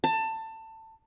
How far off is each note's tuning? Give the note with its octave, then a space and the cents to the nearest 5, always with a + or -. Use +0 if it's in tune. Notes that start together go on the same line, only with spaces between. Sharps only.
A5 +20